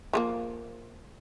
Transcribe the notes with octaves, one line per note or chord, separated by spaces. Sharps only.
F3 A3 A#3